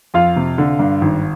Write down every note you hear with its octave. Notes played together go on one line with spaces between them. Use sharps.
F2 F4 F5
C3
D3
G2
G#1